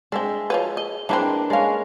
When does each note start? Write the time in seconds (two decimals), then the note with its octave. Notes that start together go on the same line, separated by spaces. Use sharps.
0.12 G#3 C4 D4 E5
0.50 F3 F#3 B4
0.77 D#5
1.09 E3 G#3 A#3 C4 D4 B4
1.50 G#3 C#4 D5 F5